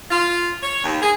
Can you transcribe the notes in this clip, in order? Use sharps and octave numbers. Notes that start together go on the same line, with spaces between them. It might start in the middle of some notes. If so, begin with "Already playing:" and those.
F4
C#5
D#2
G#4